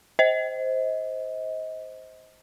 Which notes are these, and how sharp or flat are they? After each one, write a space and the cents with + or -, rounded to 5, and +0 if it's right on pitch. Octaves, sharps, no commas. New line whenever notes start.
C5 +0 D#5 +30